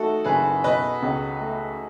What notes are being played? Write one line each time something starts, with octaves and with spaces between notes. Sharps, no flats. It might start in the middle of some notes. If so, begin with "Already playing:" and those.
Already playing: A3 D#4 F#4 A4
F#1 G#4 B4
B2 B4 D#5
C#2
A3